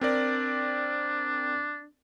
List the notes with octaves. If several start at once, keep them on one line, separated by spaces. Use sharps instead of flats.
C4 D4 A#4 D5